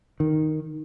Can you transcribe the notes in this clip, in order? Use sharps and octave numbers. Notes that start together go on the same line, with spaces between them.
D#3